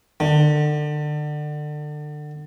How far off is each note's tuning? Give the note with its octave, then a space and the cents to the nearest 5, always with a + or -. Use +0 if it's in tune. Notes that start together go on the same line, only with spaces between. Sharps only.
D3 +30